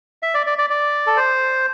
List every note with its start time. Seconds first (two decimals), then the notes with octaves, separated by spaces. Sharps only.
0.22 E5
0.34 D5
0.46 D5
0.58 D5
0.70 D5
1.07 A4
1.17 C5